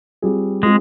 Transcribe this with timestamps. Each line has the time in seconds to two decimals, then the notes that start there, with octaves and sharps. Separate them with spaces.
0.22 G3 C4 F4 G#4
0.63 G#3 C4 F4 G#4